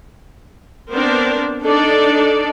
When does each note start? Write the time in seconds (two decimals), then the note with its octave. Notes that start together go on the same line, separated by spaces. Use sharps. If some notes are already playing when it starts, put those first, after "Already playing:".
0.91 B3 C4 D4 A#4 C5 D5
1.64 D4 D#4 A4 D5